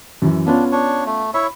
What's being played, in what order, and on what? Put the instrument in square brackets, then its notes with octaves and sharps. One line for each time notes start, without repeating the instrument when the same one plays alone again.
[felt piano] F#2 E3
[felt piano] B3 C#4 F4 [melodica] D4
[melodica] D4 C#5
A3
[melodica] E4 C#5 E5 [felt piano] B5